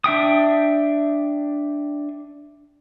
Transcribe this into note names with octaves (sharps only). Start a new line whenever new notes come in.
D4 E5 G5 D#6